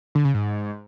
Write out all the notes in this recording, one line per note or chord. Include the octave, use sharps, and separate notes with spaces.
D3
C#3
G#2